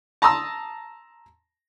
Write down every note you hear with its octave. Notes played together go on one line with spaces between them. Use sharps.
A5 A#5 C6 D#6 E6